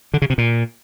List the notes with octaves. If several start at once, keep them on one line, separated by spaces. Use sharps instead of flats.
D3
C#3
C3
A#2